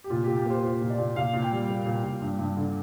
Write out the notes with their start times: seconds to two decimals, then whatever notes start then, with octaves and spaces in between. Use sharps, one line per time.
0.04 G4
0.10 A#2 F4
0.24 G4
0.28 A#2
0.37 G4
0.45 A#3 C5
0.63 F4 C5
0.81 A#2
0.90 D5
0.98 A#2
1.16 A#2 F5
1.33 A#2
1.42 G5
1.52 G3
1.69 A#3
1.86 A#2
2.03 A#2
2.21 G2
2.39 G2
2.56 D3